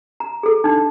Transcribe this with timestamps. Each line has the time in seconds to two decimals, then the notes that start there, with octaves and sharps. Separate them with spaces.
0.20 A#5
0.43 G#4 A4
0.64 D4 D#4